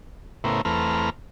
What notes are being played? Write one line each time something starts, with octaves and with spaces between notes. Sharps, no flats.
A2 C#3 B3 E4 A#4 C5
E2 A3 C4 B4 A#5 F6